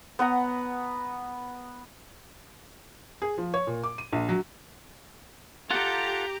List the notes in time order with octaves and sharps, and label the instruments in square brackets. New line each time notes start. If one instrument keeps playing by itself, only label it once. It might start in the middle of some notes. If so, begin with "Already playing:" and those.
[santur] B3 B4 F#5 A#5
[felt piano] G#4
F3
C#5
A#2
D6
D#7
A#1
F#3
[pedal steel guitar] F4 A4 F#5 [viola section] G4 A#5